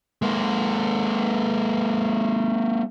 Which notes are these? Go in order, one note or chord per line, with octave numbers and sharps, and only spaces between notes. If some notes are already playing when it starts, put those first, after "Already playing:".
G#3 A#3